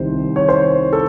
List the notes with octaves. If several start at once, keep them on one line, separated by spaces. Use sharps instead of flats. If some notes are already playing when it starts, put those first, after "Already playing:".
Already playing: C2 C3 D#3 C5
C#5
C5
A4